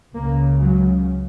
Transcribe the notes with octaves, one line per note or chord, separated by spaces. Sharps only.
C#2 C#3 A#3
F#3